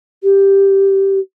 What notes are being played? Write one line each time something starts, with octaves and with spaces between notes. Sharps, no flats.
G4